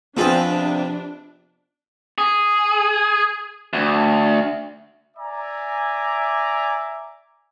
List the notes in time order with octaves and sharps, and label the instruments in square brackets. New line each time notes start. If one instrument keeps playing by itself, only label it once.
[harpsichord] F3 B4 D#5 [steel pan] B3 F4 G#4 [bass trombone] C4 [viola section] D4
[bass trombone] C3
[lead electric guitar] G#4
D2
[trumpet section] D5 E5 G#5 A#5 D6